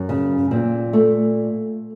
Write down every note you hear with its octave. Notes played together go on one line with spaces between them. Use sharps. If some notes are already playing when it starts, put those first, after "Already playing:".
Already playing: F#2
C#3
A#2 C4
A3